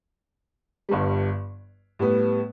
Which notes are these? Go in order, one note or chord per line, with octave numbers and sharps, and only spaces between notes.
G1 G2 G3
A2 G3 B3